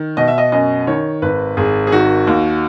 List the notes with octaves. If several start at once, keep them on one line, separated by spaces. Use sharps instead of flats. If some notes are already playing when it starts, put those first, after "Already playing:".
Already playing: D#3
B2 D#5
E5
D#5
F#2 D#5
D#3 C#5
G#1 B4
G#1 G#4
G#4
D#3 F#4
D#2